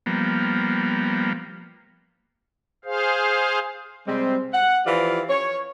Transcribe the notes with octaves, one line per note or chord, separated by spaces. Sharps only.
F3 G3 A#3 B3
G#4 C5 F5
C3 G3 G#3 C4
F#5
E3 F3 F4 G4 D5 F5
C#5